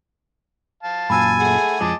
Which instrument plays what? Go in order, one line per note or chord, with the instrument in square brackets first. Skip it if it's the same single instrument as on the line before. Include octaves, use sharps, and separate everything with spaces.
[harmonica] F5 A5
[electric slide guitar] F#2 A#2 [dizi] G#5 [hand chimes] B5 E6 A6
[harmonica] A3 G#4 F#5
[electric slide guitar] F2 F3 G#3 [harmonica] D#5 A5 D6